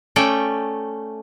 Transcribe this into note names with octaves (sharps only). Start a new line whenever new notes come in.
A3 C#4 D5 G5